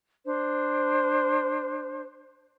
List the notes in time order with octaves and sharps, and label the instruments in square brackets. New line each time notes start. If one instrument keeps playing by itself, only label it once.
[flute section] D4 C5